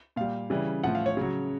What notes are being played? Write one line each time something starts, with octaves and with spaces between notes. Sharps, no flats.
A#2 G3 F5
C#3 E3 G3
A2 F3 F#5
F5
C#5
C#3 F#3